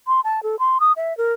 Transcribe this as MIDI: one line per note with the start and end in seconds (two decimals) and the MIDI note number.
0.07 0.20 84
0.24 0.43 81
0.43 0.56 69
0.59 0.78 84
0.80 0.92 87
0.97 1.16 76
1.18 1.33 70